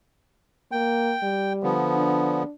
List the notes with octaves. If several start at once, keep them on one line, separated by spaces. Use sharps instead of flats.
A#3 G5
G3
D3 F3 B3
D4